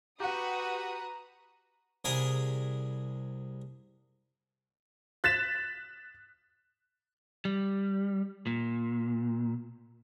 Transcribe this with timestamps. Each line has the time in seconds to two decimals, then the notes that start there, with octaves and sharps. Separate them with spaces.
0.20 F#4 G4 B4 F#5 A#5 D#6
2.05 C2 G#4 A#4 B5
5.24 F#6 A6 B6 E7
7.45 G3
8.47 A#2